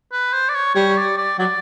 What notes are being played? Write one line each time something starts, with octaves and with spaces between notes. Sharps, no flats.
B4
C5
D5
C#5
G3 C#5
D5
D5
F#3 D5